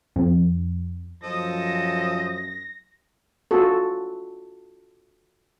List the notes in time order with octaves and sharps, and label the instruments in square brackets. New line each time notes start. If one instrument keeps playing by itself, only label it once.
[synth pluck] F2
[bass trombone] F#2 [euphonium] F3 [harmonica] A4 C5 D#5 [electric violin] A#6
[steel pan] F4 F#4 A4